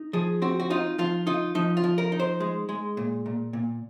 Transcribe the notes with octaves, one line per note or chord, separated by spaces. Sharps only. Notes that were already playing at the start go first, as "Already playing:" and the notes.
Already playing: D#4
F3 G#4
C4 F#4
F#4
D#4 F4
F3 F4
D#4 F4
F3 D#4
F4
F3
A#4
D#4
C5
G#3
G#3
A#2
A#2
A#2